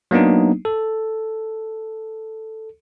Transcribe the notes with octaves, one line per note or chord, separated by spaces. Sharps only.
F#3 A#3 B3 D4 D#4
A4